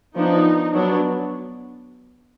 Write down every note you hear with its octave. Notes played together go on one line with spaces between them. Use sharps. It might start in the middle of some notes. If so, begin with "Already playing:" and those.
F3 B3 D4 D#4
F#3 B3 D4